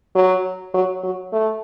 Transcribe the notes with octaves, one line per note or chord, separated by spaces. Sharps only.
F#3
F#3
F#3
A3